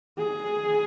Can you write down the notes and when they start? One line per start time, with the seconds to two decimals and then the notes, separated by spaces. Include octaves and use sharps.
0.18 G#4